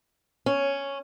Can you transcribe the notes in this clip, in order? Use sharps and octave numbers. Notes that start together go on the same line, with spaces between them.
C#4